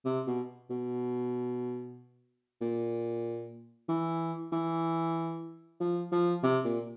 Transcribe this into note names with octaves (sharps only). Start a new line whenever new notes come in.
C3
B2
B2
A#2
E3
E3
F3
F3
C3
A#2